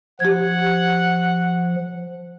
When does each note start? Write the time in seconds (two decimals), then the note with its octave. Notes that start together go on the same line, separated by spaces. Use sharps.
0.20 F3 G4 F#5 G#6